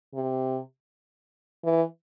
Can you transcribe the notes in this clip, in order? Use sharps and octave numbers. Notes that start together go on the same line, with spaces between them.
C3
E3